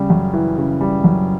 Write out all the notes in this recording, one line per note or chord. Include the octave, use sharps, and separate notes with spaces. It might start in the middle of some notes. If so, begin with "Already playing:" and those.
Already playing: C#3 G3
F#2
E3
C#3
G3
F#2